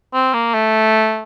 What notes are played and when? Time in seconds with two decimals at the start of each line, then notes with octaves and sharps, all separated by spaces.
0.14 C4
0.34 A#3
0.54 A3